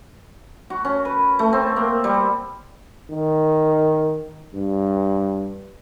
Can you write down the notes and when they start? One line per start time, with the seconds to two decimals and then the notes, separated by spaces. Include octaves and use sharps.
0.70 F#4
0.85 C#4
1.05 B4
1.39 A3
1.53 C4
1.76 A#3
2.04 G3
3.10 D#3
4.55 G2